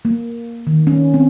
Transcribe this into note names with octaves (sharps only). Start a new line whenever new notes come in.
A#3
D#3
C#4
C4